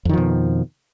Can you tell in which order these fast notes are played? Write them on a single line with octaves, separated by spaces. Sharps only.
F2 D#3 F3 B2